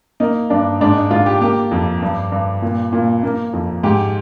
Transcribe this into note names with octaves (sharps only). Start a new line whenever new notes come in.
A#3 D#4
G2 D4
G#2 D4
D#4
G#2 F4
G4
A#3 G4
F2
G2
G2
A#2
A#2
A#3
F2
G#2 G4